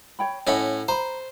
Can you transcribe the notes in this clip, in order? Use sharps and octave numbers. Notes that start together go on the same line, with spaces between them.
C#5 G5 B5
A2 C#4 D#5 F#5 B5
C5 A#5 B5